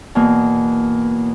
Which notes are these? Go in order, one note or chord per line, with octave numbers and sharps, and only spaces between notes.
E2 B2 A#3